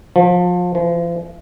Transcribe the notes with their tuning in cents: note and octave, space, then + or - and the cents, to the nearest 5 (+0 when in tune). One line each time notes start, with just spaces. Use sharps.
F3 +30
F3 -40